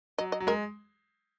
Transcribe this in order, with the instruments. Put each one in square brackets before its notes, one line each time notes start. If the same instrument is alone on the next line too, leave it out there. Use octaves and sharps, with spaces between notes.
[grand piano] F#3 [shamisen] D#5
[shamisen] D#5
[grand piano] F#3
[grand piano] G#3 [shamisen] A#4